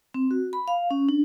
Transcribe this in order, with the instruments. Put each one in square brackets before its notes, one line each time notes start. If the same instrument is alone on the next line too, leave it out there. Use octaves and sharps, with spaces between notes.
[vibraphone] C4
F#4
B5
F5
C#4
D4